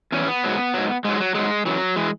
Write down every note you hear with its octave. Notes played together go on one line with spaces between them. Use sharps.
E2 E3 C#4
B3
G#2 F#3
G#2 F#3
G#2 F#3 G#3
F#3
G#2 F#3 G#3
F#2 E3 F#3
E3 G#3